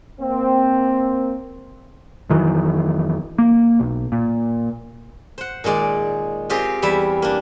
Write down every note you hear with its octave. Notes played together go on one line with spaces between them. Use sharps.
A#3 C4
F2 D#3 E3 F#3
A#3
B1
A#2
C5 F#5
A#2 D#3 G#3 D5
C4 F4 G4 G#4 A#4 G5
E2 G3 E4 E5
A#3 D4